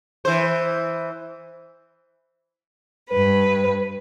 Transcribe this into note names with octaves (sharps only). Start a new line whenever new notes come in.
E3 C5
G2 B4